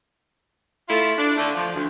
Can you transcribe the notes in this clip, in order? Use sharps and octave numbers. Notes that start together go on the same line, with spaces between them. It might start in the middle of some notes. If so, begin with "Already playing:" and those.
A3 E4 F4
D4
D3 A3
F3
D2